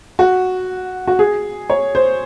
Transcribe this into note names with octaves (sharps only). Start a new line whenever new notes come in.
F#4
F#4
G#4
C#5
C5